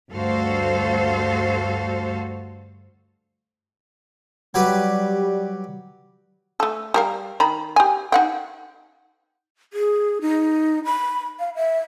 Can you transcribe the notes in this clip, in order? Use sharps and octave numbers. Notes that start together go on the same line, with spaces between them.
D2 G2 F#4 A4 C5 F5
F#3 G3 G4 B4
A3 A4
G3 A#4 F5
D#3 A#5 B5
G4 G#5
D#4 F#5 G5
G#4
D#4
B5
F5
E5